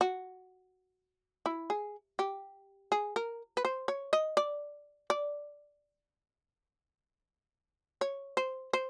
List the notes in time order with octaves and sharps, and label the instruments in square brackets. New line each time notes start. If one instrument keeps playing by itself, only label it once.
[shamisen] F#4
E4
G#4
G4
G#4
A#4
B4
C5
C#5
D#5
D5
D5
C#5
C5
C5